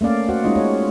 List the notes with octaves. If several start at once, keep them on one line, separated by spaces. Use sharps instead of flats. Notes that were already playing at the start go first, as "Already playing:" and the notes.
A3 A#3 C#4 D5 F5
F#4 C5 F#5
G#3 C#4 D#4 F4 D#5
C#5